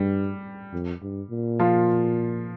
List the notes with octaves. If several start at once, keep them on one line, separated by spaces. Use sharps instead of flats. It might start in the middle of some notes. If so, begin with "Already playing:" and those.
Already playing: G2 G3
F2
G2
A#2
F3 F4